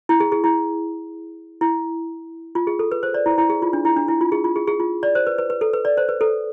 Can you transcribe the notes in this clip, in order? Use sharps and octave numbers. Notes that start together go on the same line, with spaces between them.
E4
G#4
G#4
E4
E4
F4
G#4
A4
B4
C5
D5
E4
E4
G#4
F4
D4
E4
D4
E4
F4
G#4
F4
G#4
G#4
F4
D5
C5
B4
B4
B4
A4
B4
D5
C5
B4
A4